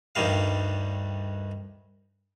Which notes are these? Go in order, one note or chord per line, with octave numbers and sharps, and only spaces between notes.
D2 G2 D#3 G3 F5